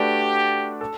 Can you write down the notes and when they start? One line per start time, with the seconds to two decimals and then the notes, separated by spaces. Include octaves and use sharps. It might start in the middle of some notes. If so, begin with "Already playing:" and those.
Already playing: A3 D4 F#4 G4 B4 D5
0.81 A4